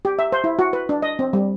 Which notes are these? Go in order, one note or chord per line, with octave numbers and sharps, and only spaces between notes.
G4
E5
C5
E4
F#4
B4
D4
D#5
C4
G3